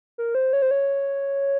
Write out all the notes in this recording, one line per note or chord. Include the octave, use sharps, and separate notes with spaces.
A#4
C5
C#5
C5
C#5